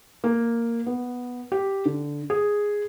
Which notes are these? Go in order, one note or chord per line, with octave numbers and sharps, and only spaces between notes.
A#3
B3
G4
D3
G#4